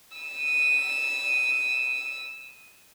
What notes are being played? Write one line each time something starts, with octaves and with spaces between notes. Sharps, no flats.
E6 D#7